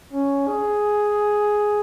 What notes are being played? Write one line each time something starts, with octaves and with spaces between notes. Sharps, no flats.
C#4
G#4